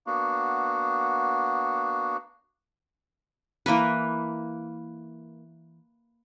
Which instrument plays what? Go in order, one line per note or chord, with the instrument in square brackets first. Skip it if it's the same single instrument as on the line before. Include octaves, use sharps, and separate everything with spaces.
[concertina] A#3 B3 D4 F#4
[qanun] E3 A#3 A#4 B4